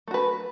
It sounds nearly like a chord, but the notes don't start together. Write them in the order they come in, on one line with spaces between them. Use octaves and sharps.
A3 F#4 B4